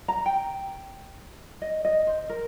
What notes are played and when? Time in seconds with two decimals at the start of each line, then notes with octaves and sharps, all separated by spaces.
0.08 A#5
0.26 G5
1.62 D#5
1.85 D#5
2.07 C5
2.29 A#4